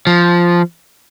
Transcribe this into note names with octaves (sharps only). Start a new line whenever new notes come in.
F3